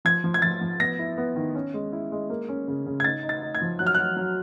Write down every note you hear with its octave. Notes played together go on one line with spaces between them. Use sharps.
F3 G#6
F3
G#6
F3 A6
F3
B3 A#6
E4
B3
D#3
C#4
G#3
E4
G#3
A#3
C#4
C#3
C#3
G#6
D#4 A6
D#4
A6
D#4
G#6
F3
F#3 F#6
F6
F#3 F#6
F#3